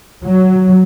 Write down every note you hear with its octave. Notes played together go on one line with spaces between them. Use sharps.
F#3